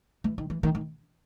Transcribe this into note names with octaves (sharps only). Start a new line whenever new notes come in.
E3
D#3
E3
D#3
D#3